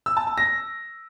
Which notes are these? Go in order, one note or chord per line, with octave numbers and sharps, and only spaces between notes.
E6
A5
A5
A#6